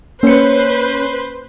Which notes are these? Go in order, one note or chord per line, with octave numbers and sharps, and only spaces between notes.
A#3 C#4 B4 C5 C#7